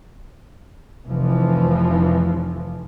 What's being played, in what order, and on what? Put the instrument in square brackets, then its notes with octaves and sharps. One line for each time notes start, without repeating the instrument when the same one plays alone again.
[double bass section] F1 E3 F3